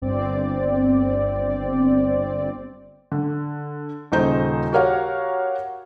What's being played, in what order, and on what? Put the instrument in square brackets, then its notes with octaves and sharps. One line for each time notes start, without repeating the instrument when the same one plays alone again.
[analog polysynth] G1 C4 D5
[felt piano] D3
D#1 C#3 D#4 C5 G6
F#4 G4 A#4 C#5 F5 F#5